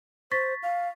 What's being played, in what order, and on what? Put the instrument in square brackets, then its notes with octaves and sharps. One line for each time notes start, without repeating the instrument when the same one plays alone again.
[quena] C5 [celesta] C#6 A6 B6
[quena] F5